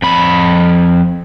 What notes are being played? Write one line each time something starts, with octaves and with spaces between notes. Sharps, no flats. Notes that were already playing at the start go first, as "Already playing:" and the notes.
F2 B5